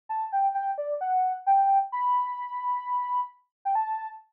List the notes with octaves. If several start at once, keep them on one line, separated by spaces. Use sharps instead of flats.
A5
G5
G5
D5
F#5
G5
B5
G5
A5